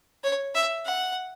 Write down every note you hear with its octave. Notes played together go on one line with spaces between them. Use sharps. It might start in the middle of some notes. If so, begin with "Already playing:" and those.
C#5
E5
F#5